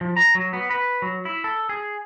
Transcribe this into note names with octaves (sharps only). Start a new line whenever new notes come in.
F3
A#5
F#3
B3
B4
F#3
E4
A4
G#4